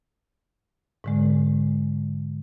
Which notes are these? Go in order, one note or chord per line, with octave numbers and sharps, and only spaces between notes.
G#2 D3 G#3